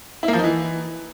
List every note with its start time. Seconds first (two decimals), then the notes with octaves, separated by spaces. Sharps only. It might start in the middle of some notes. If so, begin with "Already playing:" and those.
0.23 E4
0.28 A#3
0.33 F3
0.38 D#4
0.44 E3